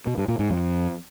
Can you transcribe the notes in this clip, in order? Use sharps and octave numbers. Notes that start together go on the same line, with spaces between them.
B2
G2
A#2
G#2
F2